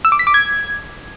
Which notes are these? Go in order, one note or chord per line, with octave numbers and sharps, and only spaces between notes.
E6
D6
B6
D6
G#6